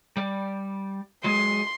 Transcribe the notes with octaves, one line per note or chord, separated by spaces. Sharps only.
G3 D5
F#3 G#3 G#4 C6